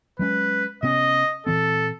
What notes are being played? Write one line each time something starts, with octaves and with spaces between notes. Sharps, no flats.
F#3 G#3 C#4 B4
C3 B3 C#4 D#5
A#2 E3 C4 A4